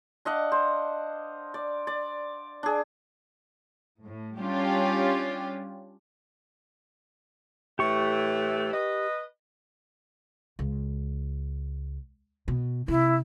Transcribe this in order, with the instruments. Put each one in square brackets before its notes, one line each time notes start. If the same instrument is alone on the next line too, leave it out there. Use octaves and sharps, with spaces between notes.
[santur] D4 D#5 F5 F#5
C5
D5
D5
D4 G#4
[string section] A2
G3 C#4 D4 F4 G4
[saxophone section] A2 E3 A3 [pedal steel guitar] G4 C#6
[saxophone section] B4 D#5
[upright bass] C#2
B2
[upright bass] C3 [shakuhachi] E4